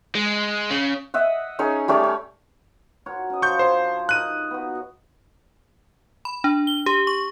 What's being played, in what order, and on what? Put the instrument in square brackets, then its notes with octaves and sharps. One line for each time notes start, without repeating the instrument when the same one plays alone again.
[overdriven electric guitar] G#3
C#3
[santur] D#5 E5 F#5
C#4 D#4 G#4 C#5
G3 A3 C#4 D5
C#4
[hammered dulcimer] F#4 A#4 C#5
C#4 D#5
[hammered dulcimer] F3 C5 [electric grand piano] C#6 G6
[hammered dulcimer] D4 C#5 [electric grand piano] C5
[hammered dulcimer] D#4 A#4 D#5 [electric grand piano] F#6 D#7
[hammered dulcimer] B3 F#4
[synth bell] B5
D4
G7
G4
C#6